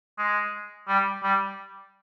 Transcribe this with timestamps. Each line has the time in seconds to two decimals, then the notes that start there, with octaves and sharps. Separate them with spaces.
0.18 G#3
0.88 G3
1.24 G3